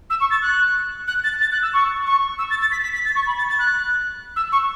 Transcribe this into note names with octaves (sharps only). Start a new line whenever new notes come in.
E6
C#6
A6
F#6
F#6
A6
A6
F#6
E6
C#6
C#6
E6
A6
A6
B6
B6
B6
A6
C#6
B5
A6
A6
F#6
E6
C#6